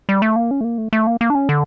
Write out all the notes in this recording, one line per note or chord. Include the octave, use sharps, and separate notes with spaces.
G3
A3
A#3
C#4
A3
A#3
A3
A3
A#3
A#3
D4
C#4
D3